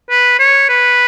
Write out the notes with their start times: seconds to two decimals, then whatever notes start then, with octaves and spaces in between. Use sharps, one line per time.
0.10 B4
0.39 C#5
0.69 B4